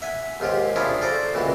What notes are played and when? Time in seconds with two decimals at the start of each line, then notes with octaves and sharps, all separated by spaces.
0.02 E5 F#5 G#5
0.40 D#2 G#2 F4 G4
0.76 F3 D4 E4 F4 G#4 C#5
1.01 F4 A4 C5 D5 A#5
1.33 C#2 A#2 E3 F#4